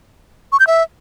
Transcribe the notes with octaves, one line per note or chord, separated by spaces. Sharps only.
C#6
G6
E5